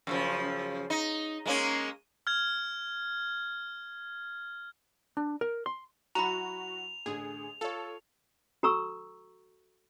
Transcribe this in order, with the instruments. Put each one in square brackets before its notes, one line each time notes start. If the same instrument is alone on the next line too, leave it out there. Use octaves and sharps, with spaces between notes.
[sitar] F#2 C#3 F3
D#4
G#3 A#3 C#4
[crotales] F6 G#6
[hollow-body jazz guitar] D4
A#4
C6
[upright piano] F#3 E4 [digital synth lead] F#4 [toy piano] A#5 B5 [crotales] F7
[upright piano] A1 D3 [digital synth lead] G#4
[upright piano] F4 C#5 [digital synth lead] A4
[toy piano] F#4 A4 A#5 C#6 E6